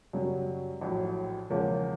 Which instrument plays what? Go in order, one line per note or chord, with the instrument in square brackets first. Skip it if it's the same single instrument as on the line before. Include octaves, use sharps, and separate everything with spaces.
[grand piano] F#2 C#3 F#3 [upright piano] G3
[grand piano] A#1 A2 F#3
[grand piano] E2 C#3 F3 A#3 C#4 [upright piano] G#3